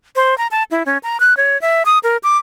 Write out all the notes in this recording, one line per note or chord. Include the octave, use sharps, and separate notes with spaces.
C5
A#5
A5
E4
C#4
A#5
F#6
C#5
E5
D#6
A#4
D6